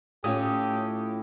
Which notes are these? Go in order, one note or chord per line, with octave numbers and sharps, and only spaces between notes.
A2 C#4 F4 G4 D#6